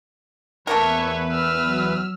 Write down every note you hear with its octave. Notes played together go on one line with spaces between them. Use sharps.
E2 A3 A#3 A#4 B4 C#5 E5
E6 F6
F#3